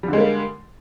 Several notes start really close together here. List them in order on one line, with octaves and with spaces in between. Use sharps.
G3 D3 G#3 A#3